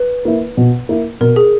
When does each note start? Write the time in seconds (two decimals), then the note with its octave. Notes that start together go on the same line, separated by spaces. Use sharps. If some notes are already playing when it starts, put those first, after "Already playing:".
Already playing: B4
0.25 A#3 E4
0.57 B2
0.89 A#3 E4
1.21 B2 A#4
1.36 G#4